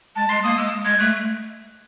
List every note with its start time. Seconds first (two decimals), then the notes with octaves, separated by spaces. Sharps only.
0.16 G#3 A5
0.29 G#3 C6
0.43 A#3 D#6
0.58 G#3 E6
0.85 G#3 G#6
0.99 A3 F#6